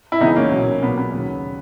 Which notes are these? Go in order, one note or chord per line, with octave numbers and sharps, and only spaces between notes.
E4
C#2 C#3 E3 B3 D#4
A#3 C#4
B1 A#2 F#3
B1 A#2 F#3 B3
B3
D#2 C#3 F#3